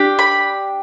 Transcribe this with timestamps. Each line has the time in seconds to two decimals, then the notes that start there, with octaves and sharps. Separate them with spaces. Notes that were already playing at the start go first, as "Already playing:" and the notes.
Already playing: D4 G4
0.19 B5